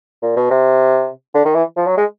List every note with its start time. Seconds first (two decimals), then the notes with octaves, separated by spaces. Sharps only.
0.23 A#2
0.37 B2
0.51 C3
1.35 D3
1.45 D#3
1.55 E3
1.77 F3
1.87 F#3
1.97 G#3